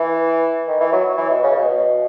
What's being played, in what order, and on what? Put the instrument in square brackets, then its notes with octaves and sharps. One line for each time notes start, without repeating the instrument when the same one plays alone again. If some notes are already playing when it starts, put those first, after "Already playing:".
Already playing: [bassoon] E3
D#3
E3
F#3
E3
B2
C#3
B2
B2